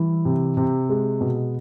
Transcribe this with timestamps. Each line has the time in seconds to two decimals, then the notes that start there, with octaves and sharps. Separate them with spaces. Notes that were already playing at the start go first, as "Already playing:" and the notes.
Already playing: E3 G3
0.25 C3
0.57 C3
0.89 G#3
1.21 B2